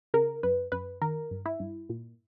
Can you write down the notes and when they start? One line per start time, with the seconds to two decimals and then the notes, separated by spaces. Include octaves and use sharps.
0.14 C#3 A#4
0.43 F#2 B4
0.72 F#2 B4
1.01 D#3 A#4
1.31 G2
1.46 E4
1.60 G2
1.89 A#2